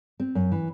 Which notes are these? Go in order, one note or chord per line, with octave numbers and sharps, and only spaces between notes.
C4
F#2
E3